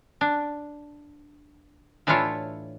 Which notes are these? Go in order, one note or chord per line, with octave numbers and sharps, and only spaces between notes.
D4
A2 E3 D4 E4 F4 C#5